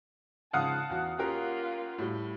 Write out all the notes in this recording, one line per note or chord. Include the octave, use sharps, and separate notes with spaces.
G#2 C#3 F3 F5 F#5 A5 D#6
E2 F#4
A#3 C#4 F4 G4 A#4
A2 G3